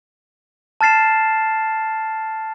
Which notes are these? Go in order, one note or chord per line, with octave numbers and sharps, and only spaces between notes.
A5 F6 A6 C7 E7